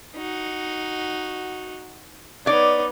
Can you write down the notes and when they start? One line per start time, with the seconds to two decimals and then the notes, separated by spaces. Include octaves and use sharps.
0.16 D#4 F#4
2.46 B3 D#4 C#5 D5